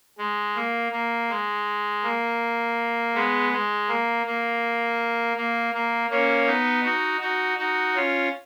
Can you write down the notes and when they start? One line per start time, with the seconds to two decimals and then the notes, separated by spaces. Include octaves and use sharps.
0.18 G#3
0.55 A#3
0.92 A#3
1.30 G#3
2.03 A#3
3.14 G#3 B3
3.52 G#3
3.88 A#3
4.26 A#3
5.37 A#3
5.74 A#3
6.10 A#3 C#4
6.47 B3 D#4
6.84 D#4 F#4
7.21 D#4 F#4
7.58 D#4 F#4
7.95 C#4 F4